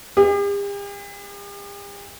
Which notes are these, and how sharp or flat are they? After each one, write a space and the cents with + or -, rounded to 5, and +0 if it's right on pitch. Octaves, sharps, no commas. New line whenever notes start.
G4 +45